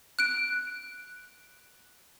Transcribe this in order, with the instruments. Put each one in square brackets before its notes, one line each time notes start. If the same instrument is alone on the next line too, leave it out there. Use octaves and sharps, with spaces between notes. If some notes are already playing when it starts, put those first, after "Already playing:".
[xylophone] F#6 D7